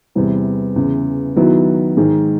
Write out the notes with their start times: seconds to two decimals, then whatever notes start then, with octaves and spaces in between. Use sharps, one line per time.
0.15 E2 C3 E3 G3
0.76 E2 C#3 E3
1.36 D#3 F#3 B3 E4
1.97 G#2 D#3 G#3